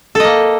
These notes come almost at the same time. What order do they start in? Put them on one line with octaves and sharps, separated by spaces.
A4 D#5 A#3